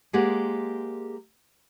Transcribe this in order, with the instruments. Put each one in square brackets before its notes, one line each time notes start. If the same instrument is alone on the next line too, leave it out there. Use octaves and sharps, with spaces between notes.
[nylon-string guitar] G#3 A#3 G4 G#4 C5 F#5